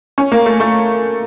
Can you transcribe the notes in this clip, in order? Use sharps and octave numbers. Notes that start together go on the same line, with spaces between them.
C#4
A#3
A3
A3